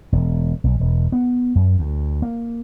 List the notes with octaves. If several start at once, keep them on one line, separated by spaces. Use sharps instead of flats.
E1
B1
E1
B3
F#2
D2
A#3